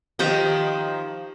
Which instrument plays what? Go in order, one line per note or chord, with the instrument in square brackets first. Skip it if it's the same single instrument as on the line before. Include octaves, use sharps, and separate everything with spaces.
[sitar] D#3 F3 [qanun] G4 D#5 A#5